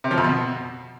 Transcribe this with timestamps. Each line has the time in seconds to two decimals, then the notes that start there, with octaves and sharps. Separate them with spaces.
0.04 C3
0.11 F3
0.18 F2
0.24 B2